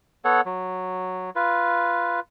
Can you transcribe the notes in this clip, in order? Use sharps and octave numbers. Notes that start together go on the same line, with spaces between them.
B3 A4 C#5 F#5
F#3
F4 B4